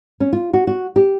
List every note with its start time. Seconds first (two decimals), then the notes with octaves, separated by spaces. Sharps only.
0.20 C#4
0.33 F4
0.53 F#4
0.67 F#4
0.96 G4